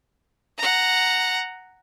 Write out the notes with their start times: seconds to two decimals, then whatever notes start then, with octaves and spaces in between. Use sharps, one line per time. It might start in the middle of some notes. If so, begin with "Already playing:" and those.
0.58 F#5 A#5